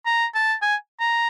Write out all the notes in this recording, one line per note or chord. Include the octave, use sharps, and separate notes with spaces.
A#5
A5
G#5
A#5